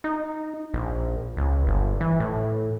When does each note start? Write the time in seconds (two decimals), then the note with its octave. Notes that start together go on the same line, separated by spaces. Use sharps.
0.04 D#4
0.74 A#1
1.37 C#2
1.67 G1
2.01 E3
2.20 A2